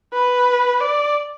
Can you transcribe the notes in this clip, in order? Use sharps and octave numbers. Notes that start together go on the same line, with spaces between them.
B4
D5